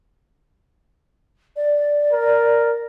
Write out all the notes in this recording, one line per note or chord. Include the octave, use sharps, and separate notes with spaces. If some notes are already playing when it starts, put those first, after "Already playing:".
D5
A#4